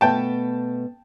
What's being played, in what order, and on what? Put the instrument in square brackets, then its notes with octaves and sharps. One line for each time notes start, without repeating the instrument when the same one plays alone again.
[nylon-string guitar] B2 A3 B3 [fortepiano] G5 A5